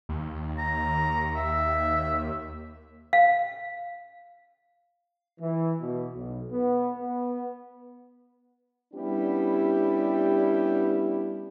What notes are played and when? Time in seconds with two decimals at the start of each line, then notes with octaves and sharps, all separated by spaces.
0.09 D#2
0.59 A#5
1.36 E5
3.13 F5
5.40 E3
5.81 B2
6.15 B1
6.52 B3
6.98 B3
8.93 G3 B3 C#4 D4 E4 G4